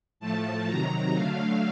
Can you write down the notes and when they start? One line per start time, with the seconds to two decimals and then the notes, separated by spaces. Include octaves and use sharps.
0.20 A2 F3 A3 A5
0.67 C3 D#3 F#3 A#5
1.14 D3 F#3 A3 F5